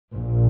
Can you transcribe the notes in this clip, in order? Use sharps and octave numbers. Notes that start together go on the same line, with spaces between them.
A#1 A#2